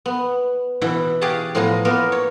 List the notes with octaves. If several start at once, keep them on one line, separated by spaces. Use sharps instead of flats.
B3
B2 E3 E4 F#5
G4 G#4 C#5 F5 F#5 A5
A2 F3 A3 B3 G#5 A#5
A#3 B3 F4 A#4
C#5